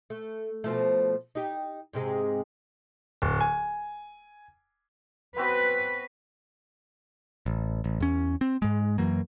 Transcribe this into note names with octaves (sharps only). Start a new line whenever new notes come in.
A3
B2 F3 A3
D#4 G4
G#2 C3 G#3
D1
G#5
B3 C4 F#4 B4
A1
A1
E2 C#4
C4
G#2 G#3
F#2 E3 F#3 A#3